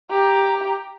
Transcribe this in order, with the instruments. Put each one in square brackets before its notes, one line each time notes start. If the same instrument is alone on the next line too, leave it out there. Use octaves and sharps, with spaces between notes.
[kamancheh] G4 A#5